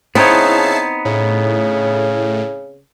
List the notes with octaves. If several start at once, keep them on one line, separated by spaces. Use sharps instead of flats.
C#3 B3 C4 D#4 E4 C#5 A5 C7
A2 C#3